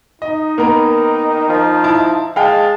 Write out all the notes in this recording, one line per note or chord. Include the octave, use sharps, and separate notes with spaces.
D#4 D#5
D#3 A#3 B3 A#4
F3
E4 A5
G#3 F5 G5 A5